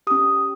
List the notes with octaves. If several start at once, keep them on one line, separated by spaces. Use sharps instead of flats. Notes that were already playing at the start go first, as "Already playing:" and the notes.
C#4 G4 D#6